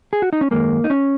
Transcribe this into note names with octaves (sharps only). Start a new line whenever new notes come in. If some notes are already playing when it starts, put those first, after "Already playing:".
G#4
F#4
D#4
C#4
F#2 D#3 G#3 A#3
D#4
C#4